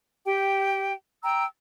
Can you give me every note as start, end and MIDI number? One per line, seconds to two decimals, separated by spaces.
0.24 0.92 67
0.24 0.92 79
1.23 1.45 79
1.23 1.45 82
1.23 1.45 88